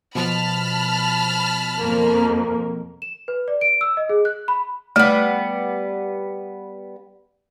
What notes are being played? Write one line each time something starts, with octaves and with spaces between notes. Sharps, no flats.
B2 F3 A5 B5 F6
F2 A#3
E7
B4
D5
D7
E6
D#5
G#4
F#6
B5
G3 A3 B3